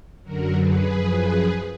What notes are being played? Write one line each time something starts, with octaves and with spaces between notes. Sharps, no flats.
F#2 D3 F#3 F#4 A#4
G#4 B4
F#2 F3